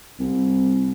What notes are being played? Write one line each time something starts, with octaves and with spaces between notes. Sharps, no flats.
C2